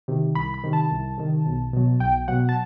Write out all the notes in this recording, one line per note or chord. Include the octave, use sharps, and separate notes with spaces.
C3 D#3
C2 B5
B5
C3 D#3
A5
C2
C3 D#3
B1
B2 F#3
B1 G5
B2 F#3 F#5
A5